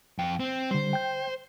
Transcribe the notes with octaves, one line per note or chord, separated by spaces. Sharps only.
F2 G5
C4
D3 G3 C5
G5 G6